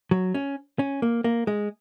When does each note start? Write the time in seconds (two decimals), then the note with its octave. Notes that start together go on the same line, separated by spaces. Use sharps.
0.11 F#3
0.35 C#4
0.79 C#4
1.02 A#3
1.24 A#3
1.47 G#3